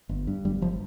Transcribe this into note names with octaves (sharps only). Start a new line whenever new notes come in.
G1
G2
G1 G3
G1 F3